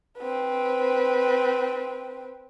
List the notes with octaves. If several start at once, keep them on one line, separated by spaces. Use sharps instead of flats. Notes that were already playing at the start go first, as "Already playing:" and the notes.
C4 B4